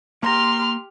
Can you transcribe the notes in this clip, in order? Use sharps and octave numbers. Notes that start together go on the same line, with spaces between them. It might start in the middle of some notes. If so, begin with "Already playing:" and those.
A#3 G4 A#5 C6 F6